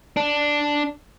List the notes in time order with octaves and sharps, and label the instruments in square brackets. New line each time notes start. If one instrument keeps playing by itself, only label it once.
[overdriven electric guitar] D4